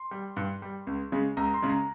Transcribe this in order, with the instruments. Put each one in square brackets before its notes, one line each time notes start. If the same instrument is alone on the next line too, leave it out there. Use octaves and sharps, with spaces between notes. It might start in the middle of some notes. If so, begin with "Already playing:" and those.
Already playing: [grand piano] C6
G3
G2
G3
C#2
C#3 G#3
C#2 A#5
C6
C#3 G#3
A#5